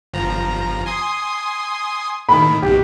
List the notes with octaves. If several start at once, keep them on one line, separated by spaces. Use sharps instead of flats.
G1 F3 A#5
G#5 C6 D#6
A2 D#3 B5
B1 B2 G4